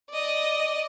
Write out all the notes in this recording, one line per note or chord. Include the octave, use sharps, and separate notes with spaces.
D5 D#5